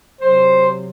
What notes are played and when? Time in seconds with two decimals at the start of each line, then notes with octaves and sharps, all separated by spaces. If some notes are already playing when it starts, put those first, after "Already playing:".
0.20 C3 F#3 C5